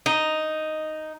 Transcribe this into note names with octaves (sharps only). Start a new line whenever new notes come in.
D#4